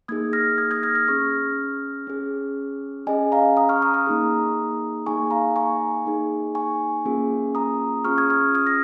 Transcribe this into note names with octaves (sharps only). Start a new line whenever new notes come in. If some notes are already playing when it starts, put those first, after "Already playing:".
A#3 D#4 G#4 D#6 G#6
F6 A#6
D#6 G#6
D#6 G#6
F6 A#6
F6 A#6
C#4 G#4 C#6 F6
C#4 G#4
C#4 G#4 D#5 G#5
F5 A#5
A#5 D#6
C#6 F6
A#5 D#6
A#5 D#6
A#3 D#4 G#4
A#3 D#4 G#4 G#5 C#6
F5 A#5
G#5 C#6
A#3 D#4 G#4
G#5 C#6
A#3 C#4 F4 G#4
A#5 D#6
C#4 F4 G#4 C#6 F6
D#6 G#6
C#6 F6
D#6 G#6
F6 A#6